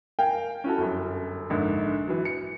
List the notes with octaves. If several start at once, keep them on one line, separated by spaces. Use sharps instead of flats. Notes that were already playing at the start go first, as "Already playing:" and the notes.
A#4 F5 G5 G#5
C#4 E4 F#4 A4
G1 F#2
A#1 G#2 D3
E3 F#3
C#7